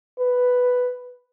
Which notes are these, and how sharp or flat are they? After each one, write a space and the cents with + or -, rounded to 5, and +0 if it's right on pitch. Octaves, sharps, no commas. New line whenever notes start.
B4 +5